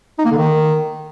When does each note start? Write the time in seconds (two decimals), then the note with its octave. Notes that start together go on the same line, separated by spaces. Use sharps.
0.19 D#4
0.25 A#3
0.31 D3
0.38 D#3